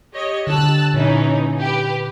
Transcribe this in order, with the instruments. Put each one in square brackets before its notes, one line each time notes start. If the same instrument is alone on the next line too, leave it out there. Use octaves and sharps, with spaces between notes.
[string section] G4 C#5 D#5
[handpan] D3 G4 [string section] A5 E6 F#6
[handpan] A#2 [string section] E3 C#4 D#4
[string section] G4 B4